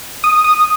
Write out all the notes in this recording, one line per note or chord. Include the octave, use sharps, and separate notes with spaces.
D#6
D#6